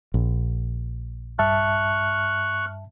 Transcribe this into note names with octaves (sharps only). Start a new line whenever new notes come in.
A#1
G2 E5 A5 C#6 F6 F#6